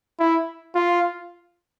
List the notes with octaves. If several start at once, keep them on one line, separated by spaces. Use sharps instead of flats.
E4
F4